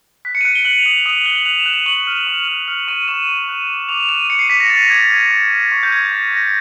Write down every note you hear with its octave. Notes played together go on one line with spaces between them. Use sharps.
F#6 B6
C#7
D#7
F#6 D7
G7
F#6 F#7
F7
D#6 F#7
D#6 F7
F#7
F#6 G7
F#7
F#6 F7
E7
F#6
D#7
C#6 F#7
F6
C#6
F6
F6 C#7
C#6 D#7
C#6 E7
C#6
F#6
D6
D6 F7
E7
F#6 D#7
F#6 C#7
C7
D6 B6
A#6
D6 A6
D6 G#6
F6 G#6
C#6
F6
C#6
G6
C#6 G#6
C#6 A6
F6 A#6